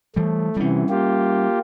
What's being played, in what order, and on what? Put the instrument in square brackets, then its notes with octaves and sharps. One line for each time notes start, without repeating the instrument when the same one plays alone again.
[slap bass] E3 G3 [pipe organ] A3
[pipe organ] C3 E3 [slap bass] G3 C#4
[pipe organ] A#3 F4 G4